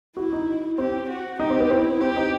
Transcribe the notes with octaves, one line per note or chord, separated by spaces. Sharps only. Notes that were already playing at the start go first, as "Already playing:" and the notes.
E4 F#4
D#4
C4 G4
F#4
D#4 G4
C4
B3
C4 E4
C4 G4
D#4